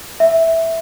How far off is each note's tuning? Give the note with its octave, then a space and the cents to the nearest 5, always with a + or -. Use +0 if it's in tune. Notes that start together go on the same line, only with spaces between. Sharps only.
E5 -5